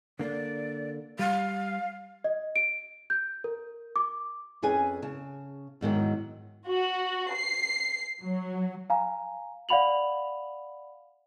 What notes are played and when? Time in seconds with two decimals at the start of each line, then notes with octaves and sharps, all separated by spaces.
0.19 D3 A#3 D5
1.19 G3 F5
2.24 D#5
2.56 D7
3.10 G6
3.44 A#4
3.96 D6
4.62 F2 C#4 G#4 B4 G#5
5.02 C#3 A5
5.81 E2 G#2 D#3 F#3
6.68 F#4
7.33 C7
8.21 F#3
8.90 F5 G#5 A#5
9.69 D5 F5 F#5 B5 F7 F#7